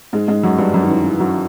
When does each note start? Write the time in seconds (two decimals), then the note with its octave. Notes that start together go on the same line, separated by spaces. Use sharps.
0.13 G#2 G#3
0.28 G#2 G#3
0.43 F#2 F#3
0.58 G2 G3
0.74 F#2 F#3
0.83 D#3
0.89 E3
1.04 E3
1.20 F#2 F#3